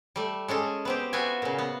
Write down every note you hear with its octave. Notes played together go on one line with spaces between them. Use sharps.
G3 A3
G#3 C#4 G#4 A4
B3 C4 G4
B3 F4 F#4 E5 G#5
A#2 C#3
B3